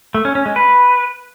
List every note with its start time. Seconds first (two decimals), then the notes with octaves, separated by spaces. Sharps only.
0.14 A3
0.25 C#4
0.35 C#4
0.46 G#3
0.56 B4